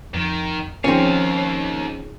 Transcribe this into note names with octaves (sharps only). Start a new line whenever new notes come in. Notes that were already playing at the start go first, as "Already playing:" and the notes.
F2 D#3
D#2 D#3 F3 C4 C#4 G#4 C#5 F5